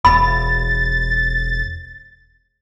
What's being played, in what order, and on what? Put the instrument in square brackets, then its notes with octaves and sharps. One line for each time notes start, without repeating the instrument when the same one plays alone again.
[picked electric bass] E1 [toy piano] B5 [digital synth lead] A6